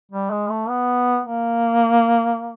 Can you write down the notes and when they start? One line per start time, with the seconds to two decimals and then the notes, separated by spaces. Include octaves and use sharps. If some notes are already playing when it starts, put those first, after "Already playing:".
0.11 G3
0.30 G#3
0.50 A3
0.69 B3
1.26 A#3